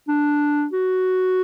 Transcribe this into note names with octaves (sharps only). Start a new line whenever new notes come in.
D4
F#4